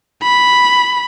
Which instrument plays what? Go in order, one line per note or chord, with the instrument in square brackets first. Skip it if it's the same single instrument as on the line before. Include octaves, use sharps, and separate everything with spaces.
[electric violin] B5